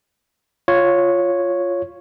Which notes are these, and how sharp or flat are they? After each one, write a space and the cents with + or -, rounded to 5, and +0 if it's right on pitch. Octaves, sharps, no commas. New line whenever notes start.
F4 +0 C#5 +0